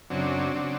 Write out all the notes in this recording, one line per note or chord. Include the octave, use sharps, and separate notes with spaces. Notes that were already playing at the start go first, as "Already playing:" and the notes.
F#2 C#3 F#3 C4 D4
C#3 F#3